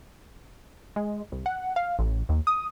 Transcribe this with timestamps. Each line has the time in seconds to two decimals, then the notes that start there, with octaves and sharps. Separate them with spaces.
0.96 G#3
1.32 C2
1.46 F#5
1.76 F5
1.99 A1
2.29 D#2
2.47 D#6